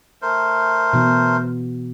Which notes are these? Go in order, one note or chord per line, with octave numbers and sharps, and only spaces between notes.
A3 A#4 C5
B2 E3 B3